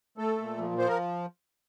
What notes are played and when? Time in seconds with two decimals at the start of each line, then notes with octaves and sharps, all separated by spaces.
0.18 A3 A4
0.38 A#2
0.58 F3
0.78 F3 C5
0.88 A#4